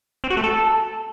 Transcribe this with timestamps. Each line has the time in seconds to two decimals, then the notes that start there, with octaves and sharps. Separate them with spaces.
0.24 C4
0.30 F#4
0.37 A3
0.44 A4